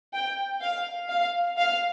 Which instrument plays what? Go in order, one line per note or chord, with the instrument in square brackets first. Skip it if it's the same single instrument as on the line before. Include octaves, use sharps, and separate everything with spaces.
[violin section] G5
F5
F5
F5